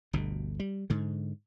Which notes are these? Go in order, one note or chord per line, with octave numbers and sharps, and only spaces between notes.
G1 D2 B2
G3
G#2 D3